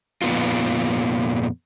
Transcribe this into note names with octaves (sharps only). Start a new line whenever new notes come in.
F2 A#2 B3 D#4 F4